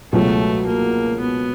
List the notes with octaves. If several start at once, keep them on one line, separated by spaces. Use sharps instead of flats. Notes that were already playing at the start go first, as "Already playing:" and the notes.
C#2 B2 F#3 A3
A#3
B3